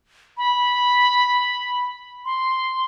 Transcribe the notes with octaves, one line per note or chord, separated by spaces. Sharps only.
B5
C6